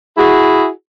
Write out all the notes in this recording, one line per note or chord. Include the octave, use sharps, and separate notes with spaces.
E4 F#4 G#4